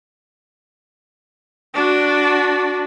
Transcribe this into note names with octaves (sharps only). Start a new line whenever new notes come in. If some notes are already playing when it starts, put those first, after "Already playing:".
D4 F#4